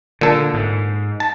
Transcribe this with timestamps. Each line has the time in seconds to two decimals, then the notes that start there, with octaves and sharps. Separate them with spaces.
0.21 A#2 D3 A4
0.54 G#2
1.20 A5